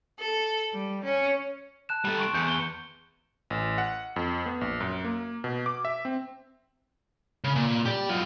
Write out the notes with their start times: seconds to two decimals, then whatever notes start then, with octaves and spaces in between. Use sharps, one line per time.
0.18 A4
0.73 G3
1.04 C#4
1.89 A5 F#6 E7
2.05 G3 A4
2.19 C6 C#6 D7
2.34 E2 G6 C#7
2.48 G7
3.50 A1
3.78 F#5
4.16 F2
4.46 B3
4.61 A#1
4.80 F#2
5.04 A#3
5.44 B2
5.66 D6
5.85 E5
6.05 C4
7.44 C#3
7.56 A#2
7.86 G4 D5
8.09 F#3 F4